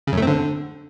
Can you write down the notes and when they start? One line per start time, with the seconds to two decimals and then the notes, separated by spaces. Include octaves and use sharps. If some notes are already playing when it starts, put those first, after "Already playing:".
0.07 C#3
0.12 F#2
0.17 A3
0.22 C4
0.27 D3